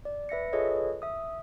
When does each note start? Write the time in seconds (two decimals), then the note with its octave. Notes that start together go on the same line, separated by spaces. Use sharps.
0.05 D5
0.29 B4 E5 A#6 C#7
0.53 F4 G#4 A4 B4 C#5 D#5
1.02 E5 D#6